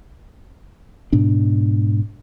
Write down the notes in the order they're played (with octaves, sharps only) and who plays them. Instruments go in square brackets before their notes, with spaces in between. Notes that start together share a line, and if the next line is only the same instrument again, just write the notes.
[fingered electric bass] G#2 B2 D4